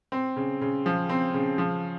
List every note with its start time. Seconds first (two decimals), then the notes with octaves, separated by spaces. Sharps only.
0.12 C4
0.36 C#3
0.61 C#3
0.86 F3
1.09 C4
1.34 C#3
1.58 F3